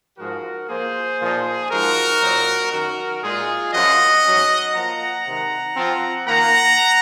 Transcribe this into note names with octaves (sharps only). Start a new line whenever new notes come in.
G#2 F3 G#3 F#4 A#4
F3 A#3 F4 G#4 C5
A#2 F3 A#3 D#4
F3 G#3 D#4 F#4 A#4
A#2 F#3 C4 D#4
F#2 D#3 F#3 F#4 A#4
A#2 G#3 D#4 F4 G#4
F#2 F3 C4 F4 D#5 F#5
G#2 F#3 C#4
F3 A#3 F4 F#5 A#5
C3 D#3 G#3
F3 C4 F4
D#3 A#3 F4 F#5 A#5